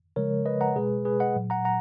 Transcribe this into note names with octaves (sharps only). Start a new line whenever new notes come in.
C#3 F3 G#3 A#4 C#5
B4 D#5
F#5 A#5
B2 G#3 G#4 B4
G#4 B4
D#5 F#5
A#2 F#3
F#5 A#5
F#5 A#5